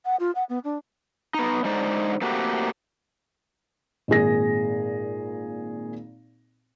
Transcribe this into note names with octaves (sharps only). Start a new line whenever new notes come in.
F#5
F4
F#5
B3
D4
B3 D#4
D3 G#3 D#4 C5 D5
A3 A#3 C4 F#4 G4
G#1 A#2 G#4 A#6